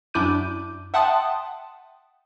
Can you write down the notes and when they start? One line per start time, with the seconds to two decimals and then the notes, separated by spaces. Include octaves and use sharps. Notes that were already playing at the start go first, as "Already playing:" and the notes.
0.14 F#2 D4 E4 D6 G6 D#7
0.94 E5 F#5 G5 A5 C6 D#6